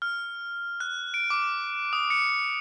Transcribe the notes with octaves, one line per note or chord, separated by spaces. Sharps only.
F6
F#6
D7
D6
D#6
C#7